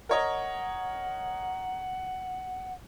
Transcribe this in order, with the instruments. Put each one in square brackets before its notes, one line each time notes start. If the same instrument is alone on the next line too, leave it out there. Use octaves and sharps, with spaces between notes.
[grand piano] A#4 C#5 D#5 [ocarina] F#5